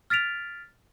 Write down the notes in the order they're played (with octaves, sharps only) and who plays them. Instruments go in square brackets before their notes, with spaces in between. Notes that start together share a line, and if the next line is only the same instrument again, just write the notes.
[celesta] F6 A6 B6 D7 F7